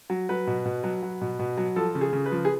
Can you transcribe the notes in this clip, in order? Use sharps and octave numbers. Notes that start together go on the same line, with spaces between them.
F#3
F#3 B4
B2
B2
F#3
F#3
B2
B2
F#3
F3 A4
C#3
G#4
C#3
B4
F3
G#4